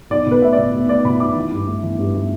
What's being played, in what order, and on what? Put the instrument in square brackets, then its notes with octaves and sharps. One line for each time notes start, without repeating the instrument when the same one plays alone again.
[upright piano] B1 D5
B2
B4
A3 E5
D5
B2
B2
A3 D5
B2 B5
B1 D6
E3
G2
A3
E3
G2
A3